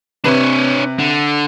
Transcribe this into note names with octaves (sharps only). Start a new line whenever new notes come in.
C3 D4 B4 C#5 E7
D3